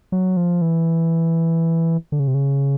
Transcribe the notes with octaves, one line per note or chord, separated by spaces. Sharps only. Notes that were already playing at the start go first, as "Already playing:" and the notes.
F#3
F3
E3
D3
C#3
C3
C#3